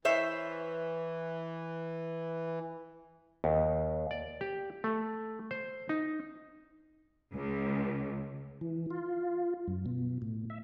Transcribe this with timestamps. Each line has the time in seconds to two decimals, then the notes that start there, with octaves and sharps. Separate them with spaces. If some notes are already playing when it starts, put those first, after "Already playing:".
0.05 E3 C5 C#5 E5
3.44 D#2
4.11 D5
4.41 G4
4.84 A3
5.51 C5
5.89 D#4
7.34 C#2
8.61 E3
8.90 F4
9.68 F#2
9.86 B2
10.22 A2
10.50 E5